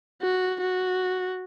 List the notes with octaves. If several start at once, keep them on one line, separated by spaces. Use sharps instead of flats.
F#4
F#4